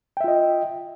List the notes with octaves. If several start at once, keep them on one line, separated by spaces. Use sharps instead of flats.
F4 D#5 E5 G5